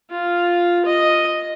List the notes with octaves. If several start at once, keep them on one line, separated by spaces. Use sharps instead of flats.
F4
D#5